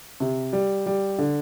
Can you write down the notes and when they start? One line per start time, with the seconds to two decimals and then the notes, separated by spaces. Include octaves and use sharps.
0.20 C3
0.53 G3
0.86 G3
1.19 D3